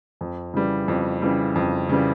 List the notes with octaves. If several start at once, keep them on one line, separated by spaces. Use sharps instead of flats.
F2
C#3 E3 G3
F2
C#3 E3 G3
F2
C#3 E3 G3